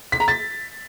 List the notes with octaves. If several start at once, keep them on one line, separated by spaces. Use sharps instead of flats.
B6
A#5
A6